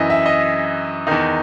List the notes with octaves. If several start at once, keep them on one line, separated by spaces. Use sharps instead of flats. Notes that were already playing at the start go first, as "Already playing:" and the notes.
Already playing: F#2 E3 D#5 E5
E5
D#5
E2 D#3 D#4